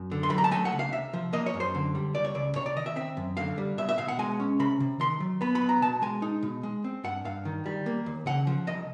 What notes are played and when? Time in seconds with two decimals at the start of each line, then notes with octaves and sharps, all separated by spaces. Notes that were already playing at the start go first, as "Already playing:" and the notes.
Already playing: F#2
0.11 D3
0.23 C6
0.30 F#3 B5
0.38 A#5
0.44 A5
0.51 A3 G#5
0.65 F#5
0.72 C#2
0.79 F5
0.92 C3 E5
1.13 F3
1.33 A#3 D#5
1.46 C#5
1.54 F#2
1.60 C5
1.75 D3
1.95 G3
2.14 C#2 D5
2.25 C#5
2.35 C#2 D5
2.55 C3 C#5
2.66 D5
2.76 D#3 D#5
2.86 E5
2.96 C4 E5
3.17 F#2
3.37 D3 F5
3.58 G3
3.78 B2 E5
3.89 E5
3.98 B2 F5
4.08 F#5
4.19 G#3 G#5
4.40 C#4
4.59 C3 B5
4.80 C3
5.00 D#3 C6
5.20 F#3
5.41 B3 B5
5.55 B5
5.61 B1
5.69 A#5
5.82 B2 A5
6.02 G#3 G#5
6.22 D#4
6.43 B2
6.63 G#3
6.84 C4
7.04 G2 F#5
7.25 G2 F5
7.45 D#3
7.66 G3
7.86 A#3
8.06 D#2
8.26 C#3 F#5
8.47 F3
8.67 C2 D#5